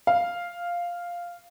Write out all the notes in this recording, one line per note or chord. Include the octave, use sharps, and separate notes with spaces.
F5